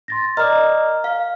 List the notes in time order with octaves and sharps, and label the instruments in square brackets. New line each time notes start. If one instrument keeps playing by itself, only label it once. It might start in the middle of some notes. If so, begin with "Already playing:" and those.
[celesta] C6 A6 A#6
[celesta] A#4 A#5 F6 [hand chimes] D5 D#5
[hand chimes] F5